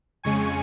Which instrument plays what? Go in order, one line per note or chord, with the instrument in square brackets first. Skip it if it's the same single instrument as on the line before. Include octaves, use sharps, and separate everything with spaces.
[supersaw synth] F2 C#3 G#3 G#5 C#6